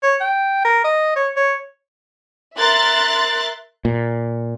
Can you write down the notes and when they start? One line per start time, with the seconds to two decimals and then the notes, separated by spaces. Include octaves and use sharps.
0.03 C#5
0.20 G5
0.65 A#4
0.84 D#5
1.16 C#5
1.36 C#5
2.58 A#4 E5 C6 F#6 A6
3.85 A#2